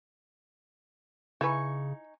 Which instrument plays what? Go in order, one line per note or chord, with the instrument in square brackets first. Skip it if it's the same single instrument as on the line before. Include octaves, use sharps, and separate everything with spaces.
[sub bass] C#3 [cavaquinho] D#4 G#5 C#6 [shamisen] E4 B4